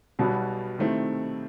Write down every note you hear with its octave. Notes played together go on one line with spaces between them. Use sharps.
B1 B2 G3 B3 F#4
C3 D#3 A3 C4 E4